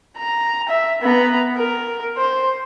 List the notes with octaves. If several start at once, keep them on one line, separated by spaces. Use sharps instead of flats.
A#5
E5
B3 A#5
A#4
C5